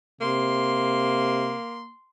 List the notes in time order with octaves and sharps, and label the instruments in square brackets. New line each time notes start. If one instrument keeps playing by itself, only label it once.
[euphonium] C3 [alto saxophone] A#3 [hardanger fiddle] C6